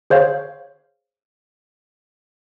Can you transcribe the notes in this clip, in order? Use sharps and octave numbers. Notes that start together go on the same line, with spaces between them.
G#4 C5 C#5 F5